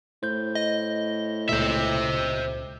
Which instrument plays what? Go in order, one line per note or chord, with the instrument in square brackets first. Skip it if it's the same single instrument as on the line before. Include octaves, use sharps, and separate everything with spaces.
[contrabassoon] A2 [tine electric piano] C5 G6
[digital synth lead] D#5
[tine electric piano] C#2 A#2 [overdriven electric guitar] C5 E5